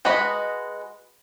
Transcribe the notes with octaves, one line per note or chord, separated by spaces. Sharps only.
G#3 F#4 B4 D#5 B5